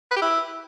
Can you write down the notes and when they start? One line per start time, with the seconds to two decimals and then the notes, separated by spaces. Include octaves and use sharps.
0.11 B4
0.17 G4
0.22 E4